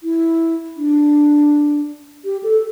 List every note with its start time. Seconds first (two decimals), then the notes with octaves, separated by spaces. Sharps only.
0.03 E4
0.77 D4
2.25 G4
2.43 A4